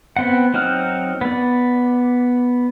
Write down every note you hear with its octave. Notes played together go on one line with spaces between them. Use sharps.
B3 C4 F#5
F#3 C4 D#4 F#5 F6
B3 D5